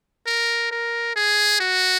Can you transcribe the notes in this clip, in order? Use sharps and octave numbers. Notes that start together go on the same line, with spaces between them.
A#4
A#4
G#4
F#4